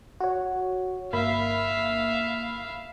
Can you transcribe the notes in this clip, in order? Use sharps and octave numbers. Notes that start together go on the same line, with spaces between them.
F#4 C#5
G1 A#3 E5 F5 B5